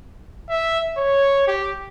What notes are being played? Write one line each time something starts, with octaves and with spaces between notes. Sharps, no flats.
E5
C#5
G4